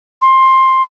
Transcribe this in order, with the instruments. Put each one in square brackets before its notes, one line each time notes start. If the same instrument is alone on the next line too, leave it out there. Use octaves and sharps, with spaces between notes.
[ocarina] C6